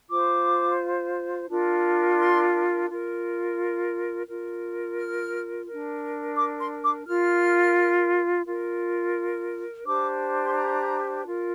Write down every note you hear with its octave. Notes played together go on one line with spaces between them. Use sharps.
F4 C5 D6
D4 F4 A#4
C6
F4 A#4
F4 A#4
F6
D4 A#4
D6
C6
D6
F4 A#4 F6
F4 A#4
D4 G4 C5 D6
C6
A#5
F4 A#4